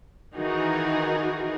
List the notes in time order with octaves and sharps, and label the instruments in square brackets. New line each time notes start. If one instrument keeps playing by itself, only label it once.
[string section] D#3 E3 D#4 F#4 G#4 A#4